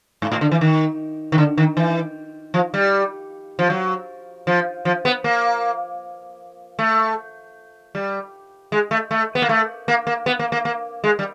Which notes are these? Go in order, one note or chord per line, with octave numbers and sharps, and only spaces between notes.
G#2
A2
D3
E3
D#3
D#3
D3
D#3
E3
F3
G3
F3
F#3
F3
F3
B3
A#3
A3
G3
G#3
A3
A3
B3
A#3
A3
A#3
A#3
B3
A#3
A#3
A#3
G#3
G3